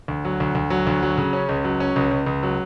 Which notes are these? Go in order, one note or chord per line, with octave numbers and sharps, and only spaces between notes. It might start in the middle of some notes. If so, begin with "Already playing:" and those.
D2
F#3
D2
D2
F#3
D2
F#3
C#3
C#4
C#2
F#3
C#4
C#2
C#2
C#2
F#3